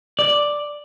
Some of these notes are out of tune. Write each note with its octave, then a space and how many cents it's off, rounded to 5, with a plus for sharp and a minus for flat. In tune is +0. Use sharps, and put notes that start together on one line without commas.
D5 +5